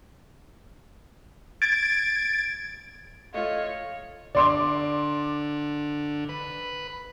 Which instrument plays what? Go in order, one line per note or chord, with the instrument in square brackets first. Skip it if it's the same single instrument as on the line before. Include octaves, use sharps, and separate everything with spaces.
[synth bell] G#6 A6 D7
[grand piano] A3 F4 [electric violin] C#5 [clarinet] D#5 [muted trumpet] F5
[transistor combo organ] D3 [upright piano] D5 C6 D6
[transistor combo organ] B4